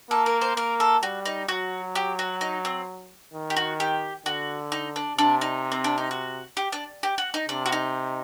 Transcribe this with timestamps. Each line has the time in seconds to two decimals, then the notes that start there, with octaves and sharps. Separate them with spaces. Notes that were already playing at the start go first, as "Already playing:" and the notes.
0.10 A#3 A4
0.26 A#4
0.41 C5
0.56 A#3 A#4
0.80 A4
1.03 G3 F#4
1.25 D#4
1.48 F#3 F#4
1.95 G4
2.19 F#4
2.41 D#4
2.65 C4
3.34 D#3
3.50 G4
3.56 F#4
3.80 G4
4.26 D3 F#4
4.72 D#4
4.96 D4
5.18 C3 D4
5.41 D#4
5.72 C4
5.84 D4
5.98 D#4
6.11 F#4
6.57 G4
6.72 D4
7.03 G4
7.18 F#4
7.34 D#4
7.49 C3 D4
7.66 F#4
7.72 D#4